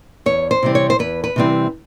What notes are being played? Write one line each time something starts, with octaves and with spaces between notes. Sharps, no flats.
E2 C#5
C5
C3 E3 G3 C4
C#5
C5
E2 B4
B4
C3 E3 G3 C4